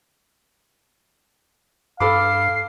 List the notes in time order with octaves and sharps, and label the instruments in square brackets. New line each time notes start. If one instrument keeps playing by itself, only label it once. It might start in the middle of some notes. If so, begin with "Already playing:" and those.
[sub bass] G2 [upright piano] A4 B5 D6 [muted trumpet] F5 [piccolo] C7